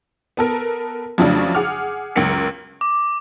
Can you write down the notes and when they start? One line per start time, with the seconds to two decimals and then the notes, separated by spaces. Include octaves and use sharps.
0.37 B3 A4 A#4
1.18 F2 C#3 F3 F#3 A3 D4
1.55 G#4 F#5 D6 F6
2.16 C#2 F#2 A#4 C#7 D7
2.81 D6